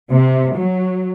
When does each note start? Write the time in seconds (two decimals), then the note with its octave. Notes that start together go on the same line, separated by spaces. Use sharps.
0.11 C3
0.55 F#3